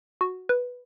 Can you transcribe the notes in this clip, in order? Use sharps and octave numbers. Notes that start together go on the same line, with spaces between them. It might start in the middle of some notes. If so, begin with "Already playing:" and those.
F#4
B4